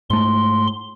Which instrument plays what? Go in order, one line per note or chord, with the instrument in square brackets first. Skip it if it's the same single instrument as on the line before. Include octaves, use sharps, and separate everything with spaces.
[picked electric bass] G#2 A3 [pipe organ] C6